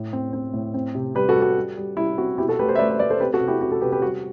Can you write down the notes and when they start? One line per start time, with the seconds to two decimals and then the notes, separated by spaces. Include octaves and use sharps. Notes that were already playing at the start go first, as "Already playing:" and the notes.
Already playing: A2
0.13 C4
0.33 C4
0.54 A2
0.74 C4
0.95 C3
1.15 G3 G4 B4
1.29 F#4 A4
1.36 G3
1.42 F#4
1.57 G3
1.77 G3
1.97 G3 E4
2.18 C4 F#4
2.38 B2 E4 G4
2.48 F#4 A4
2.59 A3 G4 B4
2.69 A4 C5
2.75 E5
2.79 A3 B4 D5
2.89 C5 E5
2.99 A3 B4 D5
3.10 A4 C5
3.20 C4 G4 B4
3.33 F#4 A4
3.41 C3
3.48 E4 G4
3.61 C4 F#4
3.72 F#4 A4
3.81 C3 G4 B4
3.92 G4 B4
4.02 G3 F#4